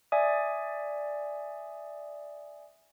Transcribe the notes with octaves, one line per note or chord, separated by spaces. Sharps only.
D5 E5 G#5 D#6